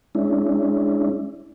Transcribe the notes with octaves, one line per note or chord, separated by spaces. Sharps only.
G#3 C#4 D4 E4